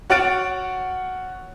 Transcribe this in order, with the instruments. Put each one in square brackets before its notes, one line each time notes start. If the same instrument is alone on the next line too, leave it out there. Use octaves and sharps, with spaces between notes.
[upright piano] F#4 C#5 F#5 F6 A6 D7